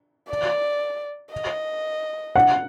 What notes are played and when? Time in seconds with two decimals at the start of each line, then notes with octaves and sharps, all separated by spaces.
0.29 D5
1.32 D#5
2.36 F#5